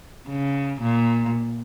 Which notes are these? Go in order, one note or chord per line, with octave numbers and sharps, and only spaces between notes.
C#3
A#2